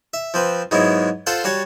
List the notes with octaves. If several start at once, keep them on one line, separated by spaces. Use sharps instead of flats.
E5
F3 C4 B4
G#2 F#3 G#3 B3 E4
F4 A4 C5 F5 F#5
G3 F#4 C#5 A5